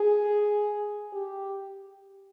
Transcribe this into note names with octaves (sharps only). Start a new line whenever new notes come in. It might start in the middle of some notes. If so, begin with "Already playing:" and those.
Already playing: G#4
G4